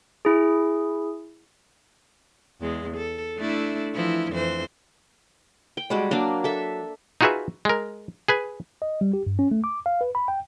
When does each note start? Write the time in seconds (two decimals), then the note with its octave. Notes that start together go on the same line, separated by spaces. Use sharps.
0.25 E4 G#4
2.61 E2 G#3
2.97 A4
3.38 A3 D4 E4
3.94 E3 F3 E4
4.32 F2 E3 C5
5.77 G5
5.90 G3 G#3 F#4
6.11 F#3 A#3 D4
6.44 A4 E5
7.21 D#4 F4 F#4 G#4 B4 E5
7.65 G#3 A#4
8.28 G#4 B4 G#5
8.82 D#5
9.01 G3
9.13 G4
9.27 G2
9.39 C#4
9.51 A3
9.64 D6
9.86 F5
10.01 B4
10.15 B5
10.28 G5